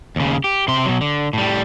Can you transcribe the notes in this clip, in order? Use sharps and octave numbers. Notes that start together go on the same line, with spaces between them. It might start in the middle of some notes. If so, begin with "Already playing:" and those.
D#2 C#3
G4
C3 C6
B2 F#3
D3
A2 G3